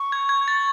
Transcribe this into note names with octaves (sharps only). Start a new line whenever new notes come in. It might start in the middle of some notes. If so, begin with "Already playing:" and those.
Already playing: C#6
G#6
G#6
A6